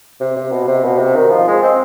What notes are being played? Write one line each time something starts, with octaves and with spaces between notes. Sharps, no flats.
C3
C3
B2
C3
B2
C3
D#3
F3
G#3
C4